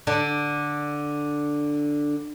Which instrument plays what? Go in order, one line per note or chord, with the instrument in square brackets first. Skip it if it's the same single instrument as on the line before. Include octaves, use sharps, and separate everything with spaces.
[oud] D3 D4